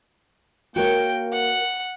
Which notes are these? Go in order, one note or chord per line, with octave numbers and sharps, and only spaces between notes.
A#3 F#4 A#4 C#5 G5
F#5